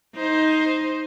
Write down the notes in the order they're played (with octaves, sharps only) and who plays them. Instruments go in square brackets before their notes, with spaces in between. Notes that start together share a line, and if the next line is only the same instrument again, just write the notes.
[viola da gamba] D#4 C5